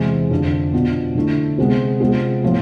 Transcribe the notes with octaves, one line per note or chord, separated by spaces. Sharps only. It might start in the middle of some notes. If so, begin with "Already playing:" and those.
Already playing: E2 C3 E3 G#3
F2 D3 F3
B2 B3 D4 F4
D3 A3 E4
C3 G#3 B3
C3 G#3 B3 F4
A2 F3 B3